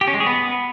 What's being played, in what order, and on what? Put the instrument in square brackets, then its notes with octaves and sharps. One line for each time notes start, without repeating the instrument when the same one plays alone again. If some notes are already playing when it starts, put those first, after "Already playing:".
[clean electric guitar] G4
C#4
G#3
G#4
B3